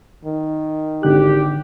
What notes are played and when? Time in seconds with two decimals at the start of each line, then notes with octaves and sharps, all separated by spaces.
0.25 D#3
1.03 G#1 D3 G4 F#6